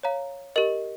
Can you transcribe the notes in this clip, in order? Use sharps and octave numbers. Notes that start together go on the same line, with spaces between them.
C#5 F5 A#5
G4 A#4 D#5